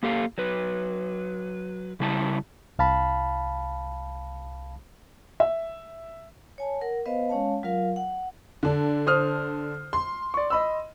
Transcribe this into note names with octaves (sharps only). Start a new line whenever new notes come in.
A#3 G4 A4 F5
F#3 B4
C#3 G3 E4 A5
C2 F5 A5 B5
E5
C#5 G#5 A5
A#4 F#5
B3 B4 C5 D#5 F5
G#3 C#4 C#5 F5 A5
F#3 F4 A#4 F5
F#5
D3 D4
C5 D#6 F6
C6
D5 C#6
D#5 B5 E6